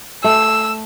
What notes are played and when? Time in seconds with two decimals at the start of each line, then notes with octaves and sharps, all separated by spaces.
0.24 A3 E6